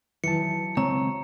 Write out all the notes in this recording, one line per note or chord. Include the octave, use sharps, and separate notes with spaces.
D#3 E3 F#3 A5 C#7
C#2 C4 C#5 A#5